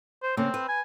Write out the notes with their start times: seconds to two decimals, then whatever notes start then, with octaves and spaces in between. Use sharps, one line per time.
0.23 C5
0.37 C#3 A#3 C4
0.54 B4
0.69 G#5